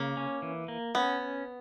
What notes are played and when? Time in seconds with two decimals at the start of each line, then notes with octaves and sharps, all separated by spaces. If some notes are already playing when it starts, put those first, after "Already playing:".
Already playing: C#3 A#3
0.17 C#4
0.42 E3
0.68 A#3
0.95 B3 C#4